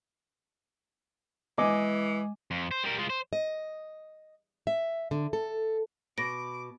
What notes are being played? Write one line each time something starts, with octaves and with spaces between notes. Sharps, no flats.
E3 G#3 D#5 G#5 D6
F2
C5
G3 A#4
G#3 F4
C5
D#5
E5
D3
A4
B2 D6 A#6 D7